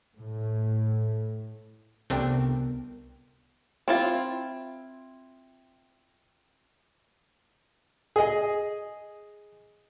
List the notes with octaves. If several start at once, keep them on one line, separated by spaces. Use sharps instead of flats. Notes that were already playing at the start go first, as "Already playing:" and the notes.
A2
C2 C3 A3 B3 C4 D4 A#4 G5
C4 E4 F4
G#4 D#5